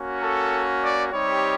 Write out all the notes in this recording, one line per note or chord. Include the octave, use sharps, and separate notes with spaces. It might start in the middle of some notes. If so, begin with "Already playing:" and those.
Already playing: A#3 C#4 F#4
A4
D5
G3 C4 D#4 G4 C#5